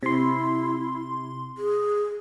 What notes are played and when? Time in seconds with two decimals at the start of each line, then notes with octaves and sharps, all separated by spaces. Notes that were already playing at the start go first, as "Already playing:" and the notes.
0.03 C3 E4 C6
1.58 G#4